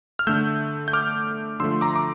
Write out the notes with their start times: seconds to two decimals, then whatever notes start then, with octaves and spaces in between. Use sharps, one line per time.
0.19 F6
0.27 D3 A3 E6 G6
0.88 G6
0.93 D6 F6
1.60 D3 F3 A3 C6 E6
1.81 A#5 D6
1.96 D6